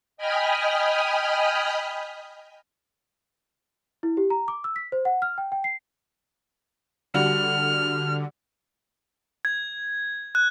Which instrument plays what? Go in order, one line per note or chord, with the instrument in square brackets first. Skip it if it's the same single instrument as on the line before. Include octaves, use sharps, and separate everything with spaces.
[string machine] D#5 G5 G#5 B5 D#6 F6
[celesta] E4
G4
A#5
D6
E6
B6
C5
F#5
F6
G5
G5
C7
[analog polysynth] D3 [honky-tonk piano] G3 F#4 [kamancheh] F6
[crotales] G#6
F#6